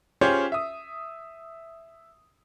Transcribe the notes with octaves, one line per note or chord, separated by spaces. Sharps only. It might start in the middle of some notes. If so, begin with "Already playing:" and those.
C#4 F4 G4 G#4 C5 C#5
E5 D#6